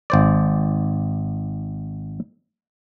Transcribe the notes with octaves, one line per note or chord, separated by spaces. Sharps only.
G#1 C5 D5